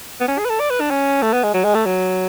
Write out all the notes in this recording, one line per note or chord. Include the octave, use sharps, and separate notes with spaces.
B3
C#4
G#4
B4
A4
D5
B4
D4
C#4
A3
B3
G#3
F#3
G#3
A3
F#3